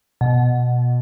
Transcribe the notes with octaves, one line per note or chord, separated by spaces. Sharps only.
B2